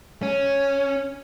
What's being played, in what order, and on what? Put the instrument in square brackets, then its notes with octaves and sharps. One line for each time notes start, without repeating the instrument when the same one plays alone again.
[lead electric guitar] C#4